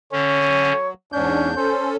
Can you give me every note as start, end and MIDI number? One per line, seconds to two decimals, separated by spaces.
0.13 0.73 50
0.13 0.73 61
0.13 0.90 73
0.49 0.94 54
1.13 1.55 40
1.13 1.55 44
1.13 1.50 61
1.13 1.55 62
1.13 1.70 91
1.56 1.96 61
1.56 1.96 69
1.56 1.91 72